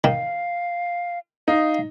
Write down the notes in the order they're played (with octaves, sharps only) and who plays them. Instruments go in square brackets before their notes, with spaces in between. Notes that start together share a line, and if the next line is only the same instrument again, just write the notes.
[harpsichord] D#3 [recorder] F5
[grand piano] D#4 [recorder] F5